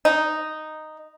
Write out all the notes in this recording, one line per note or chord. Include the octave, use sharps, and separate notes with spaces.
D#4